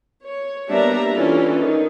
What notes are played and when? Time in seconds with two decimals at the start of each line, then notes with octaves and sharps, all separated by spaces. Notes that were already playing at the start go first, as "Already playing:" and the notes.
0.24 C#5
0.69 G3 A#3 B3 D4 E5 A#5
1.13 E3 C#4 D4 F4 A4
1.58 D#3 D#4